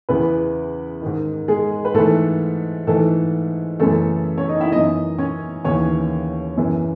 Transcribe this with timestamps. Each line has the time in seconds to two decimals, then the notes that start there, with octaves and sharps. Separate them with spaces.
0.09 E2 C#3 E3 B3 B4
1.02 G#2 D#3
1.48 G#3 G#4
1.85 B4
1.94 G#2 E3 A3 A4
2.87 G#2 E3 A3 A4
3.80 F#2 C#3 E3 A3 A4
4.37 C#4 C#5
4.49 D#4 D#5
4.61 E4 E5
4.72 F#2 E3 D#4 D#5
5.18 C#4 C#5
5.64 D#2 C#3 E3 C#4 C#5
6.57 F#2 C#3 E3